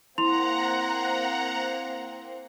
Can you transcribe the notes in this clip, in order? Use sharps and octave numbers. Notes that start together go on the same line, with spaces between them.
A#3 C4 E4 F#5 A#5 C6 F7